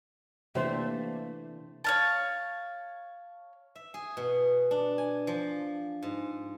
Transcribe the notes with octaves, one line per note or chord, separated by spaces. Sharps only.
C3 E3 A3 A#3 D4 G4 C5
C#5 F5 A5
E5
G#4
B2
D4
G#5
F3
G#2